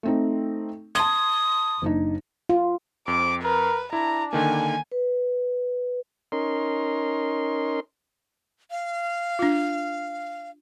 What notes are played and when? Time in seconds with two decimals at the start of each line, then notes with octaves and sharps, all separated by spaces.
0.03 A3 C4 D#4
0.95 A5 C6 D#6 G#6
1.82 F#1 D4 D#4
2.49 F4
3.08 F2 C4 D6
3.43 A#4 B4
3.93 D4 E4 A#5
4.33 D3 D#3 A#3 G#5
4.92 B4
6.32 C#4 D#4 A#4 C6
8.71 F5
9.39 D4 F4